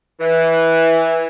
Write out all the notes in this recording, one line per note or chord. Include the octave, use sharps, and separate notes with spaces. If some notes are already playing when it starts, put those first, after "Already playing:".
E3